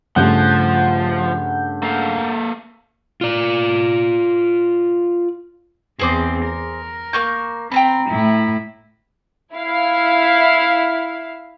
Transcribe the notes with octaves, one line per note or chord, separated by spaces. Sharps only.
G2 C#3 F3 A3 F#5 G6
A#3 A4 F5
F4 D5
E2 C4 G#4 C5 D6
A#4
A#3 C#6 G6
C4 G5 A#5 B5
A2 E4
E4 F5